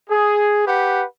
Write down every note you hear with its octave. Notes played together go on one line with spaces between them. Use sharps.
G#4
G4 B4 F#5